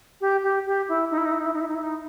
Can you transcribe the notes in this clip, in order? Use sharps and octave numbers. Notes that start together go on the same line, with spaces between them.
G4
G4
G4
E4
D#4
E4
D#4
E4
D#4
E4
D#4
E4
D#4
E4
D#4